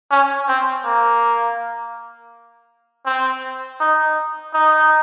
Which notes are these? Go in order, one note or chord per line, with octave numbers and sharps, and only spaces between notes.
C#4
C4
A#3
C4
D#4
D#4